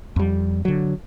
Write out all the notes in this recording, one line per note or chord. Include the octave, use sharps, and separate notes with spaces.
F2 G3
D3 F#3